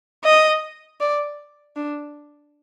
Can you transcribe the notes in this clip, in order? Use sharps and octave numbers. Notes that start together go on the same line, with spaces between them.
D#5
D5
D4